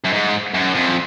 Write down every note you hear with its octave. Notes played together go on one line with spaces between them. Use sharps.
F#2
G#2
F#2
F2